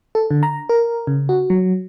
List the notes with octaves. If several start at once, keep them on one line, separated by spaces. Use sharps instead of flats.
A4
D3
A#5
A#4
C#3
F#4
F#3